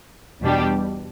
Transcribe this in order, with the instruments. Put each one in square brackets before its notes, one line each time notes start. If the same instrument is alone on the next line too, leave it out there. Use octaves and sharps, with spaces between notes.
[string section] E2 B2 G3 D4 G4